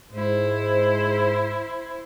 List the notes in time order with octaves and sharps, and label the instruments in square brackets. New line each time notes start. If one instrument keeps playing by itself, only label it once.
[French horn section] G#2 [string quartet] E4 C5